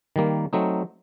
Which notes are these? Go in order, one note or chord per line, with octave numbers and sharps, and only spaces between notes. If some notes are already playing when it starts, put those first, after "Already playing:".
D#3 G3 A#3
F#3 A3 C4 D#4